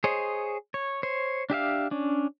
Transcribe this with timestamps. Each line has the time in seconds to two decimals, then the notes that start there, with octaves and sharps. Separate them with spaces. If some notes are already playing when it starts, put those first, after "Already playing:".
0.04 G#4 C5 C#5 D#5
0.74 C#5
1.03 C5 C#5
1.50 D4 G4 E5 F5
1.91 C#4 D4